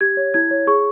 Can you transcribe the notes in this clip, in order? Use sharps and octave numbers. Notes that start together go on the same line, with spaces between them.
G4 G#6
C#5
E4 G#6
C#5
G#4 C#6